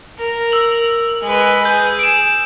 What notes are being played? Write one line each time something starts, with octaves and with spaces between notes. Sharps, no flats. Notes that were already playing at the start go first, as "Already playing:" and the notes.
A#4
E6 F7 F#7
G#3 B4
G#4 G6
D7 E7